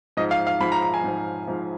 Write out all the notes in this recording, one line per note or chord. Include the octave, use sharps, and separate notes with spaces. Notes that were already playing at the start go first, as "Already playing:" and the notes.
G#2 F3 D#5
F5
F5
G#2 F3 B5
A#5
A#5
G#5
G#2 F3
G#2 F3